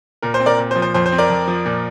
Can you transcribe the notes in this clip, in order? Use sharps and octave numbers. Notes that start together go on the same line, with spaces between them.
A#2 A#4
C5
C4
A#4 D5
A#2
C5
F3
C5
F2 C5
C5
C4
A#4 D5
F2
F3
A#2